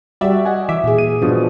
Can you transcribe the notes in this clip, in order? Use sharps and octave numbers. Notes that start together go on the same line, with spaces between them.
G3 F#4 G4 D5 E5
D#5 F#5 G#5
E3 E5 D6
A#2 G#4
D#7
G2 B2 F3 D4